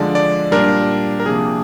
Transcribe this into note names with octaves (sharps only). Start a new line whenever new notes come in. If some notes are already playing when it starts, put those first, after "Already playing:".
Already playing: D3 F3 G#3 D4 D5
D5
A#2 G3 D4 A#4
A#4
C3 F3 A#3 D4 G#4